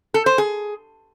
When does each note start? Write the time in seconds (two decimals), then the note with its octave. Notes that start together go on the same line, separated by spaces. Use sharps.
0.14 A4
0.26 C5
0.38 G#4